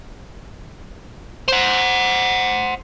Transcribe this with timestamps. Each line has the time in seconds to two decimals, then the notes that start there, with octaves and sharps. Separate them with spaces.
1.48 C5 F#5